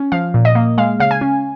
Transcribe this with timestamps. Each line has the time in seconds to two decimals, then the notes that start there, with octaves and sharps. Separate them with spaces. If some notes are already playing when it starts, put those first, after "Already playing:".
Already playing: C#4
0.12 F3 F5
0.34 A#2
0.45 D#5
0.55 A#3
0.78 G#3 F5
1.00 C#3 F5
1.11 G#5
1.21 C#4